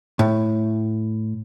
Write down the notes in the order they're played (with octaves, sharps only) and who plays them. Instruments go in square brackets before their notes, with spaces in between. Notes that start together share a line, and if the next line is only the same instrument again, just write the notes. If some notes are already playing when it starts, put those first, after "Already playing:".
[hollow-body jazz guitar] A2